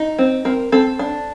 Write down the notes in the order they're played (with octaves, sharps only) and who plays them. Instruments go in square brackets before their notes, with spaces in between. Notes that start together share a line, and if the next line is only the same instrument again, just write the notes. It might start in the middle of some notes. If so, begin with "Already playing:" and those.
Already playing: [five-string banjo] D#4
C4
C4 A#4
C4 A4
D4